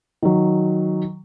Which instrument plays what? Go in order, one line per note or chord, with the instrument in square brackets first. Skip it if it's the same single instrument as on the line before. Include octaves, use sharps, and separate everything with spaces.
[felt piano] D#3 F#3